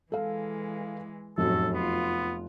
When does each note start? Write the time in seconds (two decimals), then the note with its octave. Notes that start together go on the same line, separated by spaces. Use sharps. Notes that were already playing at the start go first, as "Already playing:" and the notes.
0.12 E3 G#3 A4 F5
1.38 F1 F#2 A2 F#4 A4
1.75 B3 F4